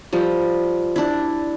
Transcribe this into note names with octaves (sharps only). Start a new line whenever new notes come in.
F3 G3
D4 E4